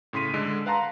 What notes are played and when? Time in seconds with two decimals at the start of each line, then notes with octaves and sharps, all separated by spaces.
0.13 A2 C#3 C6 B6 D#7
0.33 D3 G#3 A4 D7
0.66 B4 F5 F#5 A5 A#5 C6